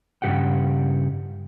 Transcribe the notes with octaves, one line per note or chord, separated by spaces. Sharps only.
G2 C#3 E3 G4 F#5 G5